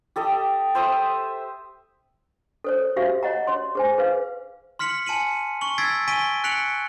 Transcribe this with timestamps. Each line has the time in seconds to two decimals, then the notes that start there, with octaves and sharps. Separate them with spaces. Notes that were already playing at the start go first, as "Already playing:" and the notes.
0.16 G4 A4 D#5
0.75 C5 E5 D#6
2.64 A4 C5 C#5
2.96 F#4 G4 C5 E5 F5
3.23 C#5 D#5 F#5 A#5
3.47 C#5 C6
3.75 G#4 C5 G#5
3.98 G#4 B4 C5 F5
4.79 C6 F6 B6 C#7 F#7
5.06 G#5 A5 C#7 D#7 F#7
5.61 C#6 F#7
5.78 E6 G#6 A6 B6 C7 D7
6.08 G#5 C#6 B6 D7 D#7 G7
6.44 F#6 B6 C#7 D7 F7 F#7